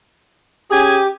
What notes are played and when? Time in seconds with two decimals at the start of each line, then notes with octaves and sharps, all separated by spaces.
0.71 C#4 G4 G#4 G#5